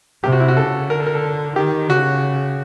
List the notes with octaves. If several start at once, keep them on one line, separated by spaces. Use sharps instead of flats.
C3 G4
F#4
E4
F#4
C#3 A4
D3 A#4
A4
A#4
A4
D#3 G4
C#3 F#4